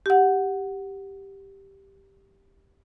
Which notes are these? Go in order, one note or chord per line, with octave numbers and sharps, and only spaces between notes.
G4 F#5